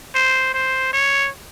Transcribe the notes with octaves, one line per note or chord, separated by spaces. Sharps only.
C5
C5
C#5